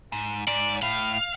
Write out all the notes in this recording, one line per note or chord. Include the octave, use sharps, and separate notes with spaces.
G#2
G#2 D5
A2 F5